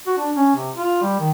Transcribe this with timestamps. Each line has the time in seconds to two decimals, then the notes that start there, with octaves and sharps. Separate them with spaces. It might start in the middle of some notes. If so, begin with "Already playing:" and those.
0.07 F#4
0.18 D4
0.36 C#4
0.55 C3
0.75 F4
1.02 G3
1.20 D#3